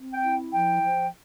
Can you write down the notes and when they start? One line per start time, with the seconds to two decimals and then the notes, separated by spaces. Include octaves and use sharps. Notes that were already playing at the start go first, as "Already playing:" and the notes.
Already playing: C4
0.12 G5
0.23 E4
0.52 F3 G5
0.81 F3